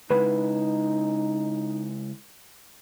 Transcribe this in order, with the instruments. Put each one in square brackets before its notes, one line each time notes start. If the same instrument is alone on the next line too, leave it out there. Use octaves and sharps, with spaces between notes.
[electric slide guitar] C#3 G#3 E4 [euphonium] D#4 [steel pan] B4